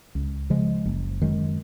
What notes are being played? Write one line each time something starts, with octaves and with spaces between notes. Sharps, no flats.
C#2
C#3 F3 G#3
F#1
F#2 D#3 G#3